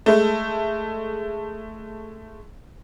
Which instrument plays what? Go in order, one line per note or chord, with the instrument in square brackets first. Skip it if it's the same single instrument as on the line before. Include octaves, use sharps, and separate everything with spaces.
[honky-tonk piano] G#3 A3